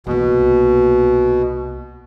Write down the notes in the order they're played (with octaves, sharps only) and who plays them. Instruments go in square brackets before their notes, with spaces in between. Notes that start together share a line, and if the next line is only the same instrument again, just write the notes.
[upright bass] C2 A#3 [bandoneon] B2